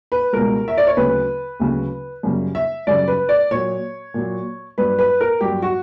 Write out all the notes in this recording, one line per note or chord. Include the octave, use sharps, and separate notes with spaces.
B4
C#2 B2 G3 A#4
E5
D5
C#5
D2 C#3 F#3 B4
D2 C#3 F#3
F#2 C#3 G3
E5
F#2 C#3 G3 D5
B4
D5
A#2 F#3 C#5
A#2 F#3
G2 F#3 B4
B4
A#4
G2 F#3 G4
F#4